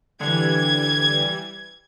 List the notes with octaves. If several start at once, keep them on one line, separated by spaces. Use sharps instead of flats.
D3 E3 G3 D4 G#6